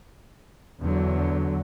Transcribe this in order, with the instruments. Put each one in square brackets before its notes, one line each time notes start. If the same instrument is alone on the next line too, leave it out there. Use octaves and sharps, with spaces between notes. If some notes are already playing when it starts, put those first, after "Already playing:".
[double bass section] E2 D3 F#3